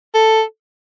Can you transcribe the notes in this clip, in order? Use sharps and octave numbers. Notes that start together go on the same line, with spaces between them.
A4